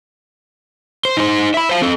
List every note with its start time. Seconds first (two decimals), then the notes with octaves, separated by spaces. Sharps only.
1.05 C5
1.17 D#4 C5
1.54 E5 B5
1.69 C5 F5
1.82 C4 A4